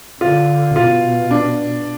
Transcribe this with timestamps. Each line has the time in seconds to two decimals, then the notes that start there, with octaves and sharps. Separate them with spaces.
0.21 D3 F4
0.76 B2 F4
1.31 D4